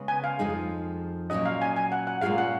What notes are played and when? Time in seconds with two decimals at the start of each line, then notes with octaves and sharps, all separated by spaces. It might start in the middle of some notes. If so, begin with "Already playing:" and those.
Already playing: C#3 G#3 B3
0.08 G#5
0.24 F5
0.39 F2 F3 G#3 D#4 G#4
1.30 A#2 F#3 C#4 F#4 D#5
1.45 F5
1.62 G#5
1.76 G#5
1.92 F#5
2.07 F#5
2.22 A#2 G#3 C#4 F4 G#4 F5
2.38 F#5